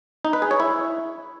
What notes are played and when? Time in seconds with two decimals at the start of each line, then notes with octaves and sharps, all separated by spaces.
0.25 D#4
0.33 B4
0.42 G#4
0.51 C#5
0.60 E4